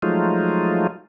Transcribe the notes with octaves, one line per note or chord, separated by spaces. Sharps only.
F3 F#3 G#3 A3 D#4 F4